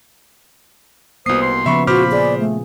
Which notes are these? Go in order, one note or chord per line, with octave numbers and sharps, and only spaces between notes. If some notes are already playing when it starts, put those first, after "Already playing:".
C2 A#3 B3 F#4 C5 D#6 C7
C6
C#3 F3 B3 E5 B5 C#6
A#2 F4 F#4 C5 B5 D6 F6
G#4 D5
A3